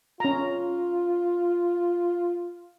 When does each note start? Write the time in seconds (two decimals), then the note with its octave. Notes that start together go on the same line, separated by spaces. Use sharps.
0.20 C#4 F4 A#5